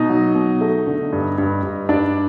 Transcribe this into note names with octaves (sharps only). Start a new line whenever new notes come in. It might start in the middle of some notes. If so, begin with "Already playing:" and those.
Already playing: B2 D#4 D#5
F#3
B2
A3
D3
G2
G2
G2
G2 D4 D5